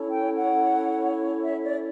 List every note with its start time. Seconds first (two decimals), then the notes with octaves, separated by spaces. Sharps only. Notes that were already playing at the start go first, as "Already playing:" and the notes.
Already playing: C#4 E4 A4 C#5
0.09 G5
0.36 F#5
1.42 E5
1.62 D5